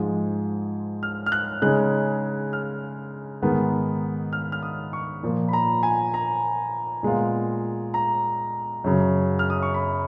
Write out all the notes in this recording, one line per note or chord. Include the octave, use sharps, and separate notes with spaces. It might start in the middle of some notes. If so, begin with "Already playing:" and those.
Already playing: G#2 F3 G#3
F6
F6
F#6
C#3 G#3 D#4 F#6
F6
G#2 D#3 G#3 B3
F6
F6
D#6
C#6
A#2 F3 A#3
B5
A#5
G#5
A#5
A#2 G#3 B3 F4
A#5
F#2 C#3 F#3
F6
D#6
C#6
B5